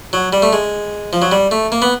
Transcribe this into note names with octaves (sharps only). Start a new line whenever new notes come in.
F#3
G3
A3
G#3
F3
F#3
G3
A3
A#3
B3